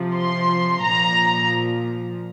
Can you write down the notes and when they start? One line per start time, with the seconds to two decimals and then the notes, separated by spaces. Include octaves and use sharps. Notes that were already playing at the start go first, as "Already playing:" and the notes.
Already playing: C3 F3
0.16 C6
0.83 A#2 F3 A#5